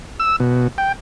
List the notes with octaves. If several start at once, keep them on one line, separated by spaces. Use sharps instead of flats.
E6
B2
G5